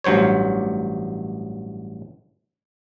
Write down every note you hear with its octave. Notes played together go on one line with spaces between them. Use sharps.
A1 G2 F#3 C5 C#5